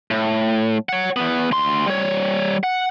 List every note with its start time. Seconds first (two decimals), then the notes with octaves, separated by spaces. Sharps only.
0.11 A2
0.89 C#5 F#5
1.16 E2 B3
1.51 D2 C6
1.87 G3 C#5
2.63 F#5